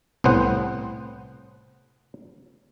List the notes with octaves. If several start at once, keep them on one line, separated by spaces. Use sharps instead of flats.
C2 A2 B3 C5 F#5